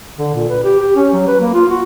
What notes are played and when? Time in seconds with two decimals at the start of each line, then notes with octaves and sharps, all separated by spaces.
0.18 D3
0.34 A#2
0.49 B4
0.63 G4
0.79 G4
0.96 C#4
1.13 F#3
1.27 B4
1.40 A#3
1.53 F4
1.69 F#4